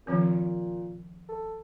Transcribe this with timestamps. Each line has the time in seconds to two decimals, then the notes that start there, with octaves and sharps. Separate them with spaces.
0.07 A#2 D#3 F3 C4
1.29 A4